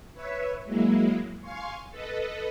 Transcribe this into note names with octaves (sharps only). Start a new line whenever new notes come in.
B4 C#5 E5
F#3 G#3 A#3 E4
F5 G#5 C6 C#6
A4 B4 D#5